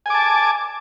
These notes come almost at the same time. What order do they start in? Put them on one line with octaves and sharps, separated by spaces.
G#5 D6 A5